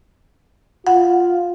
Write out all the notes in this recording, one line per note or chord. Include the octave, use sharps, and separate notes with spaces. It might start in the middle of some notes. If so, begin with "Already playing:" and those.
F4 F#5